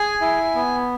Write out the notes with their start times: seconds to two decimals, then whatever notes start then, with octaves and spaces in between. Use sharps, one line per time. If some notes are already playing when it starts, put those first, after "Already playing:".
Already playing: G#4 G#5
0.21 E4
0.55 B3